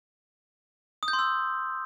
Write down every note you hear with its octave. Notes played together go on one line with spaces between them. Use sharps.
D#6
G6
C6
E6